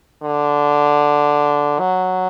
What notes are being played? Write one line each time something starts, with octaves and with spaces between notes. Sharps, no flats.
D3
F#3